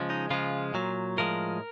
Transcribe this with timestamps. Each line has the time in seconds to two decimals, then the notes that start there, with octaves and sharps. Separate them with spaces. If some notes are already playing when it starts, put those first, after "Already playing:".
Already playing: C#3 F3 G#3
0.10 D#4
0.30 C#3 F3 G#3 F4
0.74 A#2 F#3
1.17 A2 F3 G#3 A#4